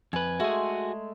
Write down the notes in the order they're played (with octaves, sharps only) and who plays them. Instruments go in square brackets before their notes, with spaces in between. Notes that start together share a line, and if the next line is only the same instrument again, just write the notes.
[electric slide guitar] F2 B4 [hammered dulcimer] G#5
[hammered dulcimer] G#3 A3 [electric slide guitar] F#4 G#4